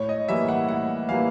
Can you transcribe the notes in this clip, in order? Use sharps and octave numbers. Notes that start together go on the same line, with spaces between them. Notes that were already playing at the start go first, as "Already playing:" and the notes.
Already playing: A2 C#5
D#5
E3 G3 A#3 E5
F#5
A2 F#5
E3 G3 A#3 F5